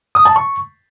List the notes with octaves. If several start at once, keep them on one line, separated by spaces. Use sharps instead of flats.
D#6
A5
C#6